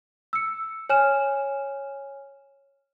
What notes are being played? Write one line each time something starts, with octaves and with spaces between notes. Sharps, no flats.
E6 C#7
C#5 G#5 F6 E7